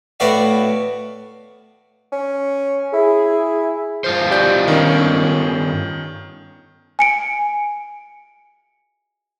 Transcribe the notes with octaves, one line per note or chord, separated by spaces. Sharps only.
A2 B3 F#4 D5 E5 F5
C#4
E4 G#4
G2 F4 C5
G4 D5 G6
D#3 C#4
G#5 C#7 D7